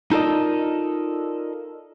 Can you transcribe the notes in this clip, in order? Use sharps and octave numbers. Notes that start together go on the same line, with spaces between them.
D#4 F4 A4 A#4 D5 D#5